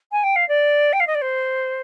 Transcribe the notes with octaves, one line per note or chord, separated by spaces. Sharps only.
G#5
G5
F5
D5
G5
F5
D#5
D5
C5